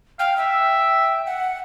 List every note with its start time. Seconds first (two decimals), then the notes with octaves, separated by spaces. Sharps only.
0.19 F5 G5
0.37 E5 G5
1.26 F#5